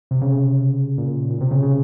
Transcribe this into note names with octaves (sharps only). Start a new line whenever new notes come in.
C3
C#3
A#2
A#2
C3
C#3
C#3